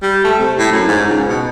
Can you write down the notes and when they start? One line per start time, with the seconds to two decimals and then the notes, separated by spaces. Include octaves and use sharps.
0.02 G3
0.24 A3
0.38 C3
0.58 A2
0.72 F#2
0.88 G#2
1.08 C#2
1.27 B2